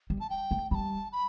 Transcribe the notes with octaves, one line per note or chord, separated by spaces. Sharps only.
G3
A5
G5
A3
G3 A5 B5
B5